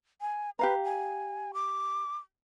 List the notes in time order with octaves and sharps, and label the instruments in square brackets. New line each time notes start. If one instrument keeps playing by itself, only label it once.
[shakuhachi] G#5
[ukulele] G4 F5 A#5 [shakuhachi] B4
[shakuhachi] G#5
D6